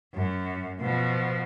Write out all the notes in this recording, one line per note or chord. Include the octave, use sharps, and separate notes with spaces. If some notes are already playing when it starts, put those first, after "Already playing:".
F#2
B2 F3